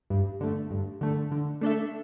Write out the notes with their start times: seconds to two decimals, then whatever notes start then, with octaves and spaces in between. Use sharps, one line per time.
0.10 G2
0.40 D3 A3
0.70 G2
1.01 D3 A3
1.32 D3
1.61 A3 D4 A4 E5